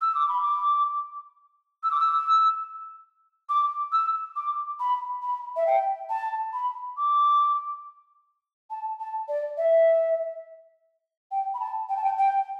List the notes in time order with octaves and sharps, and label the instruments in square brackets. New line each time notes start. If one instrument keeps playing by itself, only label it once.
[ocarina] E6
D6
B5
D6
E6
D6
E6
D6
E6
D6
B5
B5
E5
G5
A5
B5
D6
A5
A5
D5
E5
G5
B5
A5
G5
A5
G5
G5